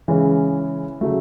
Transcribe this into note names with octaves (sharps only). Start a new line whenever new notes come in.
C#3 E3 G#3 C#4
C#3 F#3 A3